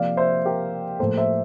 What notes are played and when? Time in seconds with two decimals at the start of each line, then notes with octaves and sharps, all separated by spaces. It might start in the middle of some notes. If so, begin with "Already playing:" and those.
Already playing: C3 F3 A#3 D5 F5
0.17 C5 E5
0.45 G4 A#4
0.99 A2 F3 A#3 A4 C5
1.17 C5 E5